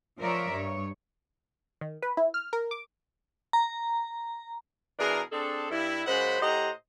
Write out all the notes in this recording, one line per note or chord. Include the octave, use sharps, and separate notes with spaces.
F3 A#4 C#5 D5 E5
G2 C#5
D#3
B4
E4
F6
A#4
D6
A#5
B2 E3 D4 G#4 A#4
C4 D4 G#4 A4
G2 E4
F#2 C#3 G#3 C5 F#5 B5
A2 G4 C5 D#5 F#5 A#5